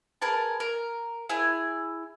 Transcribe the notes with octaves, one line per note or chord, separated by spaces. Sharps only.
G#4 A#4 B4 A5
A#4
E4 G#4 G#5